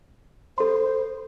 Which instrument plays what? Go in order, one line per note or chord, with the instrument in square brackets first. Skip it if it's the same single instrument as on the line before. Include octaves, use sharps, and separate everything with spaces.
[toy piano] A4 C6 [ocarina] C5